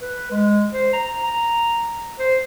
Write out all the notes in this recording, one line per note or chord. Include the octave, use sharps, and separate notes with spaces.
B4
G#3
C5
A#5
A#5
C5